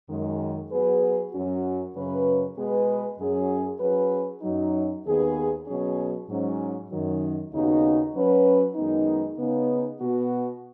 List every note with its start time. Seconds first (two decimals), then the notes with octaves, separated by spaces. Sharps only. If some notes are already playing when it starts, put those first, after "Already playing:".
0.09 F#2 D#3 G#3
0.71 F#3 B3 G#4 B4
1.33 F#2 F#3 C#4 F#4
1.94 F#2 C#3 F#3 C#4 B4
2.57 B2 G#3 B3 G#4 B4
3.19 F#2 F#3 C#4 G#4
3.80 F#3 C#4 G#4 B4
4.42 F#2 F#3 D#4
5.04 D#2 D#3 B3 G#4 B4
5.66 B2 F#3 C#4 G#4
6.28 G#2 F#3 C#4
6.90 F#2 D#3 F#3
7.52 D#2 C#3 B3 D#4 F#4
8.14 F#3 C#4 B4
8.75 F#2 D#3 G#3 B3 D#4
9.38 C#3 B3 D#4
10.00 B2 B3 F#4